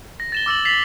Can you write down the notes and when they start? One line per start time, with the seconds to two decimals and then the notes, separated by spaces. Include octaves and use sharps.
0.20 A#6
0.32 A6 E7 G7
0.46 D6 E6 A6 F#7
0.65 A6 B6 C7 F7 F#7